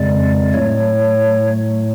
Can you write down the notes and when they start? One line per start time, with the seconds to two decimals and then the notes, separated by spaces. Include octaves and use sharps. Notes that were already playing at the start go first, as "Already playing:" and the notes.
Already playing: F2 C#3 G#3 D5
0.53 A2 F#3 A3 C#5